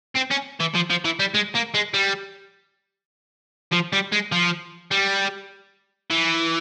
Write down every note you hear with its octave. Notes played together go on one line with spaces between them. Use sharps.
C4
C#4
E3
F3
F3
E3
G3
G#3
A#3
G#3
G3
F3
G3
G#3
F3
G3
E3